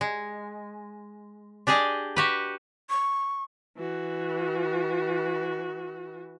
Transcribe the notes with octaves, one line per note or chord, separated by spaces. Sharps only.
G#3
D4 G4 G#4 D5 D#5
F#4 G4 B4
C#6
E3 F#4